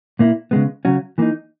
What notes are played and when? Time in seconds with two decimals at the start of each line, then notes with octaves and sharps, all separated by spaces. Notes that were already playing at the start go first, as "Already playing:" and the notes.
0.19 A#2 A#3 E4
0.51 C#3 G#3 B3
0.85 C#3 F#3 C#4 F#4
1.18 E3 A#3 D#4